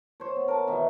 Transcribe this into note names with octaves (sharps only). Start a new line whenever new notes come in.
C5 C#5
B3
A#4 A5
B2 D#3 E3 B4